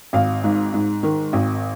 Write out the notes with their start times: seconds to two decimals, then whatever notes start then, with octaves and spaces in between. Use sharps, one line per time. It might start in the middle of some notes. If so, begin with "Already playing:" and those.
0.13 G#1 F5
0.44 G#2
0.74 G#2
1.03 D#3
1.33 G#1